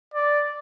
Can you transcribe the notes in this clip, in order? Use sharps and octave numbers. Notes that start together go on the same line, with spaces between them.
D5